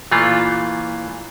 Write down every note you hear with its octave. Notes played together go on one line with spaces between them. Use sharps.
A#2 E3 A3 F4